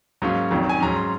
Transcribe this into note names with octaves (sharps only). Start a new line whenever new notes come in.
G#2 F#3 A#3 C#4
F1 F2 D#3 F#3
G#5
G#2 F#3 C#4 A#5
C6